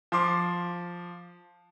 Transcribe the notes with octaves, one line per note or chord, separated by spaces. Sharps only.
F3 C6 D6